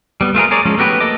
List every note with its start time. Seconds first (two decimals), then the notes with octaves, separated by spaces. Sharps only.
0.21 G3 B3
0.35 A3 F4 G#4 A#4
0.51 G#4 A#4 C#5 D5
0.65 F3 G#3 C#4
0.78 A3 B3 F#4 G4 B4
1.00 A#3 A4 D#5 D6